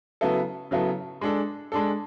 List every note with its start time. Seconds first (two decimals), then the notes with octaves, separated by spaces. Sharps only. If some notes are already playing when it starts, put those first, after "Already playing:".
0.21 C#3 F#3 B3 E4 A4
0.71 C#3 F#3 B3 E4 A4
1.21 G#3 D4 A4
1.72 G#3 D4 A4